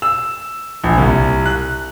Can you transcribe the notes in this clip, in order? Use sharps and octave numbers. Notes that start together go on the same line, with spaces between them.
E6
A#1
C2
F#6